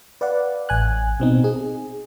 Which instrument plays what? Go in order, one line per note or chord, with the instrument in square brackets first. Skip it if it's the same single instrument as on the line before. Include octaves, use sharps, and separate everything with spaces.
[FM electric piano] B4 D5 F5 F#5
A1 G#5 F#6
B2 C4 D#4
G#4